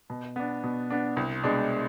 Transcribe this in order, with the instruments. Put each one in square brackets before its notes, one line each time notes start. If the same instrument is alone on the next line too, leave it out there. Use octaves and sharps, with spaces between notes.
[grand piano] B2
B3 D4
B2
B3 D4
C2
B2 G#3 D4